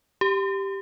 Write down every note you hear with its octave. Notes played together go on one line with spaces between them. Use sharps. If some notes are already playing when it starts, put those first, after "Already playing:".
G4